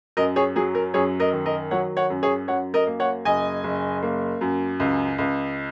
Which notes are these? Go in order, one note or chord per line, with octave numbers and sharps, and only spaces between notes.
F#2 A#4 D#5
G#4 C#5
F#3 G#4
A#4
F#2 G#4 C#5
A#4 D#5
D#3
A#4 D#5
F#3 C#5 F#5
C#5 F#5
F#2
G#4 C#5
F#2 C#5 F#5
A#4 D#5
A#3
C#5 F#5
F#1 D#5 G#5
F#1
A#3
F#2
C#2
C#2